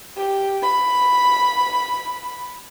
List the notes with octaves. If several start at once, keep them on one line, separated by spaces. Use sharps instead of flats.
G4
B5